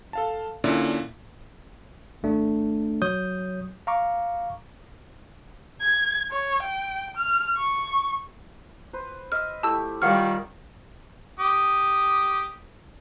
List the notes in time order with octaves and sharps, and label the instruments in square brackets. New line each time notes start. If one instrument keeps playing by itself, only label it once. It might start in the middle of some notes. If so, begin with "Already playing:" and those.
[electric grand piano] A4 F5 A5
A#2 D3 C#4 E4
[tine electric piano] G#1 A3 D4
F#3 C#5 D#6 G6
F5 A#5 C#6 D6
[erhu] G#6
C#5
G5
F6
C#6
[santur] B4 C5
[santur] D#5 E5 [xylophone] F6
[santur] A3 E4 G4 [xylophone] A5 E6
[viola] D#3 G3 [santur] F4 C#5 D6 [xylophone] F5 F#5 F6
[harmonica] G4 D#6